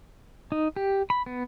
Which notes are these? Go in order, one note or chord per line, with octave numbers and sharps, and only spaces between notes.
D#4
G4
B5
B3